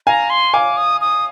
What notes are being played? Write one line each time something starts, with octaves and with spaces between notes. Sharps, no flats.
F5 G#5 A#5
C6
F5 G#5 D6
D#6
D#6